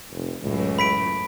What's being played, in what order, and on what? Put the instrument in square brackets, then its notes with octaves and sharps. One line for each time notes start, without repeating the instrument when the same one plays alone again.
[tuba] F1
[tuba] C#2 [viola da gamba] F#2 A2 E3
[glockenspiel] B5 B6 D7